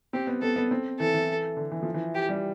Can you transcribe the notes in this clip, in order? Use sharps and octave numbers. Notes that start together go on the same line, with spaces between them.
C4 G4
B3
B3 A4
B3
C4
E3 A4
E3
D3
E3
F3
E3
G4
G3